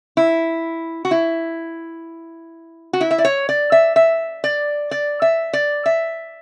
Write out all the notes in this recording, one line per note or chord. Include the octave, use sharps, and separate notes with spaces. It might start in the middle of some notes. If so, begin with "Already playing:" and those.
E4
F#4
E4
F#4
E4
E5
D5
C#5
D5
E5
E5
D5
D5
E5
D5
E5